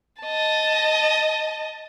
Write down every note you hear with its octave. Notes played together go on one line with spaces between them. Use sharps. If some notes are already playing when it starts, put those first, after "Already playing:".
D#5 A5